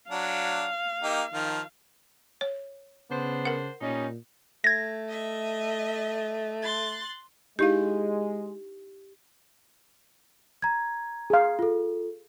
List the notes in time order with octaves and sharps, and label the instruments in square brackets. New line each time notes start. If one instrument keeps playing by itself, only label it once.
[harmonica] F#3 D4 [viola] F5
[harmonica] A#3 D#4 G4
D#3 F3 F6
[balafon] C#5
[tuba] C#3 [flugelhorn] B3 [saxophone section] D4 C5
[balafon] A#4 F#5
[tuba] A#2 [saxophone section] G3 D#4 [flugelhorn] C#4
[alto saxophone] A3 [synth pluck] G#6 A#6
[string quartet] D#5 E5
C6 F#6 A6
[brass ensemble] G#3 [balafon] D#4 E4 F5 [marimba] G4
[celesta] A#5 G#6
[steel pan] G#4 F5
[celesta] F4 A4